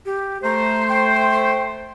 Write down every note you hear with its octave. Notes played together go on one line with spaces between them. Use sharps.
G4
A3 C5 A#5
G5